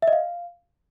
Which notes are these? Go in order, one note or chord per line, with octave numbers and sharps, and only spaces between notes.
E5
D#5
F5